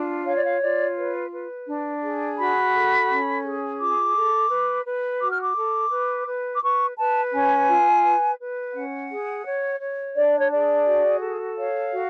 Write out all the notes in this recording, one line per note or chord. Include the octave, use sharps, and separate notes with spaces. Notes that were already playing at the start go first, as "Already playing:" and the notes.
Already playing: D4 F4
C#5 F5
D5
F5
F4 D5
B4
B4
D4
G#4
F#4 B5
A4
C#4
G#4
F4 D6
A4
B4
B4
F#4 D6
F6
D6
A4
B4
B4
D6
B4 C#6
B4 A5
C#4 G#5
F4
B4
B4
C#4 F#5
G#4
C#5
C#5
D4 D5
C#5
G#4 D5
F#4
A4
C#5 F5
F#4